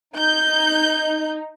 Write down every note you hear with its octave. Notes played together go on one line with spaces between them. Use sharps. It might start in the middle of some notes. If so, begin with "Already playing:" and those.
D#4 G6